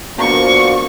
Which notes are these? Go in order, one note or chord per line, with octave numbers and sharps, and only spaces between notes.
F3 A#3 B3 D4 F#4 D5 C#6